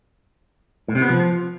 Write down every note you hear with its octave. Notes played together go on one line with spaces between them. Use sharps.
A2
C3
B3
F3